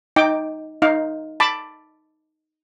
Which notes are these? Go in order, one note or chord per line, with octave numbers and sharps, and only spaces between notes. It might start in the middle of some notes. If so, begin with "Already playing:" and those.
D#4 G5 D6
D#4 F5
A5 B5 D6